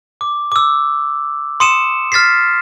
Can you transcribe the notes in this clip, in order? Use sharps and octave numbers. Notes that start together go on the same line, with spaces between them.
D6
D6 E6
C6 D#6 C#7 D#7 E7
F6 A6 B6 C7